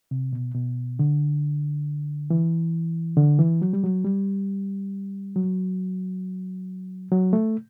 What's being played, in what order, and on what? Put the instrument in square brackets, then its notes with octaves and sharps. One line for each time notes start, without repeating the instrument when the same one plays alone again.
[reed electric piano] C3
B2
B2
D3
E3
D3
E3
F#3
G3
F#3
G3
F#3
F#3
A3